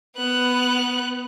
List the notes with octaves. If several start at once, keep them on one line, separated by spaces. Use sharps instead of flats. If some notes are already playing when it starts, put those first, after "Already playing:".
B3 F#6